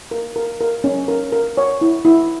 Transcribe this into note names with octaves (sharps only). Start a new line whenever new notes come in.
A#4
A#4
A#4
C#4
A#4
A#4
C#5
E4
E4